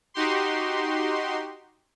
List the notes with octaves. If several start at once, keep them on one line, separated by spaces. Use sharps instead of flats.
D#4 F#4 G4 C6